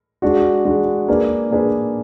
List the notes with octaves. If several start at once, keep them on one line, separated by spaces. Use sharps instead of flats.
G#3 D4 F#4
G#3 D4 F#4
A#3 D4 G#4 B4 D5
A#3 D4 G#4 B4 D5